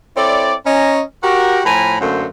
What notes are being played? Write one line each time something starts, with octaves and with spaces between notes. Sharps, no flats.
C4 E4 A4 C#5 D5
C#4 D#5 A#5
F#4 G4 A#4
A2 F3 G#5 A#5 B5
F#2 D3 A3 A#3 F#4 C5